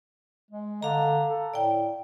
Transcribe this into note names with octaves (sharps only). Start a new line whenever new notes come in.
G#3
D3 F5 A#5
A4
A2 D5 G5